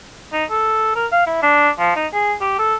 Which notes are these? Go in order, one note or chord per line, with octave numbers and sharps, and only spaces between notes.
D#4
A4
A#4
F5
E4
D4
F3
D#4
G#4
G4
A4